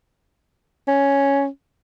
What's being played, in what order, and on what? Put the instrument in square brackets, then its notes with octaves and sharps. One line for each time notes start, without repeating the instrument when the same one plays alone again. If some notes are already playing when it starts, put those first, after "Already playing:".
[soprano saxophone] C#4